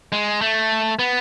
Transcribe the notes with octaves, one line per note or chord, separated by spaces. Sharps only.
G#3
A3
B3